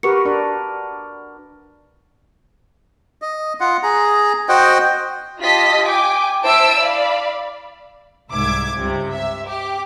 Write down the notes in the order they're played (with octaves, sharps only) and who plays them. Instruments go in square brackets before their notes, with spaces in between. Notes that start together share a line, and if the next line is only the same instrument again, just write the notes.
[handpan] F#4 A#4 B4 [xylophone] G4 C#6 C#7
[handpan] D4 A#4 D5
[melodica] D#5
F4 F#5
G#4 A#5
F#4 C5 D#5 G5
[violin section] F4 G4 D#5 A5 B6
G5 G#5 D6
E4 C5 E5 A5 E6 D7
D5 F5 B5
[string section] C2 G#2 E5 D6 G#6
C#2 G2 C3
E5
G4 D6